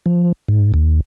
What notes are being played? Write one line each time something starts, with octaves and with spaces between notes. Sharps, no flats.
F3
G#2
D#2